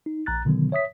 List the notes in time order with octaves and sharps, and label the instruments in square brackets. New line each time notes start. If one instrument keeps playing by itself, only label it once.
[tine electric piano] D#4
A#1 A#5 F#6 A6
B2 D3 D#3 F#3 B3
C#5 E5 D#6 B6